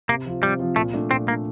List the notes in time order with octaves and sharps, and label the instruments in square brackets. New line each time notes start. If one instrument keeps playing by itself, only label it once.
[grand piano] C3 [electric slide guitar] A#3
[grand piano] F3 C4 F4
[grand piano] C3 [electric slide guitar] G3
[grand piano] F3 C4 F4
[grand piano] A#2 [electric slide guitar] A3
[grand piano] A3 D4
[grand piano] A#2 [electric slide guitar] C4
[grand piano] A3 D4 [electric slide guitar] A#3